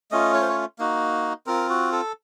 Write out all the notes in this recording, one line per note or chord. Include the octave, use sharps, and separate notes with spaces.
A3 C#4 F4 D#5
C#5
C5
C#5
A#3 D#4 F#4
C4 F4 A#4
F#4
A4